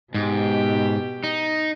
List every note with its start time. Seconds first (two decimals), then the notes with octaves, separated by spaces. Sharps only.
0.14 G#2 B2 G4
1.24 D#4